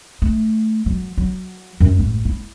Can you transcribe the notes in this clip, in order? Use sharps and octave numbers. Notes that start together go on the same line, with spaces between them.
A3
F#3
F#3
F#2
A1
E4